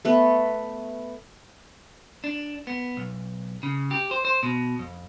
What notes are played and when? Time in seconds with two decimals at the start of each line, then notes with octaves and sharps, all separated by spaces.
0.05 A3 B3 B4
2.24 D4
2.67 B3
2.97 B1
3.63 C#3
3.91 G4
4.11 C5
4.25 C5
4.43 B2
4.79 F2